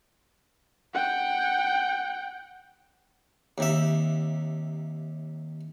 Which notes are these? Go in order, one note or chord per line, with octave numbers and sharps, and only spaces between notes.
F#5 G5
D#2 C3 E5